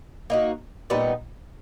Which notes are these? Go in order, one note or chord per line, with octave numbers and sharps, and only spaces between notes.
A#3 D#4 F#4
A#2 G3 B3 D#4